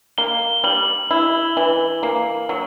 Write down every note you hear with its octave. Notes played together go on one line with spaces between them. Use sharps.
A#3 G7
G3 F#7
E4
E3
A#3
F#3